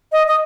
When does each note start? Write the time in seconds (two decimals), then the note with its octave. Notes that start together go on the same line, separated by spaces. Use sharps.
0.12 D#5
0.27 D#5